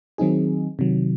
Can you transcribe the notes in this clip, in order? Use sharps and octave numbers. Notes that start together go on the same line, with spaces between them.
D#3 F#3 C4 D#4 G#4
C3 D#3 F#3